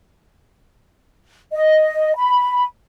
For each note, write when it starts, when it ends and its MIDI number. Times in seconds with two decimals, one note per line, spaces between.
1.52 2.13 75
2.16 2.64 83